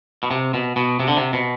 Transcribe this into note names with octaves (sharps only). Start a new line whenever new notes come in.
B2
C3
B2
B2
C3
D3
C3
B2